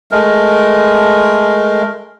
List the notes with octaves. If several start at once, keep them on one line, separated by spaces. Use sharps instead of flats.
G#3 A3 A#4